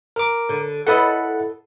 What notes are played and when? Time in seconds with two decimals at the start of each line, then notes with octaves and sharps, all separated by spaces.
0.16 A#4 D6
0.49 D3
0.87 E4 A4 B4 D#5 F#5